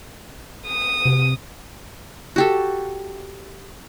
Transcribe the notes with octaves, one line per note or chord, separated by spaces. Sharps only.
D#6
C3
F#4 G4 A4